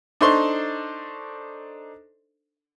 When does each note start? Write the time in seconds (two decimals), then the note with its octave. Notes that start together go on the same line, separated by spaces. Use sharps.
0.21 D4 D#4 A4 C5 C6 C#6